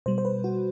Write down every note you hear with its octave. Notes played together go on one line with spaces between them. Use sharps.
B2 G3 C5
C5
B4
F#4